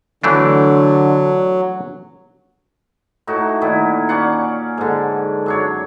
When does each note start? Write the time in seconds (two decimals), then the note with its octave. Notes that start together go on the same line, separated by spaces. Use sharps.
0.24 D3 E3 F#3 A3 D4
3.27 A2 D#4 F#4
3.61 A#2 D#3 E4
4.09 C#4 D5 F5 F#5
4.78 G#2 D3
5.46 F#2 D4 C#5